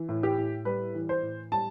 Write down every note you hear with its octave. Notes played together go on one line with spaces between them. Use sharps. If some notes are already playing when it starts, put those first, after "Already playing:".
Already playing: E3
A2
G4
A2
G3 B4
E3
C5
A2
G3 A5